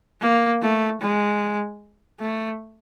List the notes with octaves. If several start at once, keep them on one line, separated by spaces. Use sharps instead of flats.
A#3
A3
G#3
A3